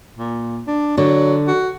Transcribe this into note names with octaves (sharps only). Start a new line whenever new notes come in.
A#2
D4
D3 F#3 D4
F#4